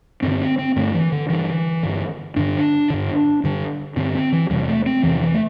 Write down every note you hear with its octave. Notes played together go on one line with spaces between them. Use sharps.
G2 D3 C4
C4
C4
G2 D3 A3
E3
D3
G2 D3 E3
G2 D3
G2 D3 D4
G2 D3
G2 D3
G2 D3 C4
C4
E3
E2 C3 G3
A3
C4
E2 C3 E3
E3
A3